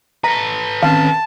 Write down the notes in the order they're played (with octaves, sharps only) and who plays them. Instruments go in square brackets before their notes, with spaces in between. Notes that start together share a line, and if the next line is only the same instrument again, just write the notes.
[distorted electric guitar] A4 B4 [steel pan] A#5
[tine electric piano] D#3 C4 C#4 [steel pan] F5 [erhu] A5